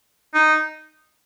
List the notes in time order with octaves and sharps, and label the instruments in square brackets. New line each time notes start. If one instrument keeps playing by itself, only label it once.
[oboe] D#4